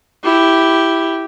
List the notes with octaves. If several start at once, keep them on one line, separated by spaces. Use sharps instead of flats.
E4 G4